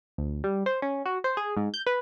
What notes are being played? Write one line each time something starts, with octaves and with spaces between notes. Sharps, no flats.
D2
G3
C5
C#4
F#4
C5
G#4
G#2
G6
B4